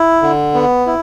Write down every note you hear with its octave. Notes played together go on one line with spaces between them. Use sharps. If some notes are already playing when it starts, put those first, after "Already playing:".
Already playing: E4
D3
B3
E4